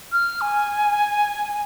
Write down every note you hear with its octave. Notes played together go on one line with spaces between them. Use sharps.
F6
G#5